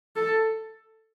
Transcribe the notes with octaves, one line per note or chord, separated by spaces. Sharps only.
A4